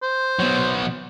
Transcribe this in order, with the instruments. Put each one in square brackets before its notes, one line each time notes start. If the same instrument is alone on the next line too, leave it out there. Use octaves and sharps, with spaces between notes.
[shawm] C5
[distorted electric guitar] B2 F#3